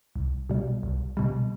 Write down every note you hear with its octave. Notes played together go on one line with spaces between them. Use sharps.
C2
B2 G3
C2
B2 G3